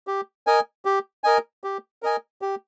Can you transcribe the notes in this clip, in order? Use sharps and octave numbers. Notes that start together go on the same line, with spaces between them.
G4
A#4 D#5 G#5
G4
A#4 D#5 G#5
G4
A#4 D#5 G#5
G4